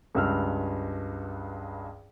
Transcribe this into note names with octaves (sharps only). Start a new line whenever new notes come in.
C#2 G2 E6 F6